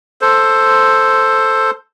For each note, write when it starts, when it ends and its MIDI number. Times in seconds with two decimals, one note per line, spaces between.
0.22 1.71 69
0.22 1.71 72